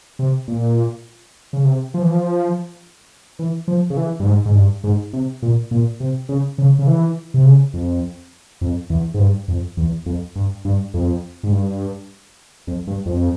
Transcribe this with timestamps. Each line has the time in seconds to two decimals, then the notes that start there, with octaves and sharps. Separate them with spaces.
0.19 C3
0.48 A#2
1.53 C#3
1.65 C3
1.94 F3
2.02 E3
2.10 F3
3.39 E3
3.68 F3
3.90 C#3
3.97 E3
4.20 G2
4.26 G#2
4.46 G#2
4.55 G2
4.84 G#2
5.13 C3
5.42 A#2
5.71 A#2
6.00 C3
6.29 C#3
6.58 C#3
6.79 C#3
6.87 E3
7.34 C3
7.45 C#3
7.74 F2
8.61 F2
8.90 E2
9.14 G#2
9.19 G2
9.48 F2
9.77 E2
10.06 F2
10.35 G2
10.65 G2
10.94 F2
11.43 G#2
11.52 G2
12.67 F2
12.87 G2
13.06 F2